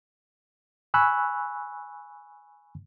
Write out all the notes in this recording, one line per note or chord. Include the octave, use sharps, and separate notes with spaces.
G#5 B5 C#6 E6 F#6